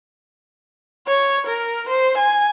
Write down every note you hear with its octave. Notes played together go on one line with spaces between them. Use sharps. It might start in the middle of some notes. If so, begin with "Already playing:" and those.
C#5
A#4
C5
G#5